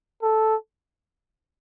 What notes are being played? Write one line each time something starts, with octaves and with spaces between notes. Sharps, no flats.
A4